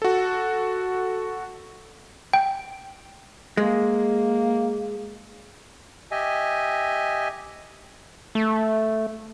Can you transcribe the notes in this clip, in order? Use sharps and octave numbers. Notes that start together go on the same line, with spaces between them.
F#4 A4
G5
G#3 A#3
G4 D#5 E5 G#5
A3